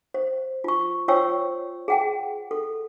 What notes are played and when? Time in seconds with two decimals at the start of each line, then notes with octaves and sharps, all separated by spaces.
0.14 C5
0.64 F4 C#6
1.08 F4 C5 C#5 G5 C#6 E6
1.88 G#4 F#5 G5
2.51 A4